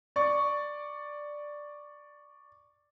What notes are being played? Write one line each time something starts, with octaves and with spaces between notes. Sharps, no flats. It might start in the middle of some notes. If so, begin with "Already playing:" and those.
D5 C#6